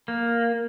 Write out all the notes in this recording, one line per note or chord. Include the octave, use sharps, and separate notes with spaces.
A#3